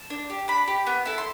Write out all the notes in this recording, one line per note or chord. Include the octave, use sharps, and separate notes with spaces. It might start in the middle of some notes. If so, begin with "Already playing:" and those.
Already playing: A5
D4
G4
D4 B5
G4
B3
E4 A4
C6